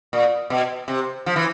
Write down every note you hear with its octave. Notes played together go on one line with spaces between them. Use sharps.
A#2
B2
C3
F3
E3